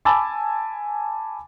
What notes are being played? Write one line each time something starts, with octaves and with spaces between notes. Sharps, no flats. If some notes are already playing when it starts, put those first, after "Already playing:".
G#5 A5 B5 D6 E6 A6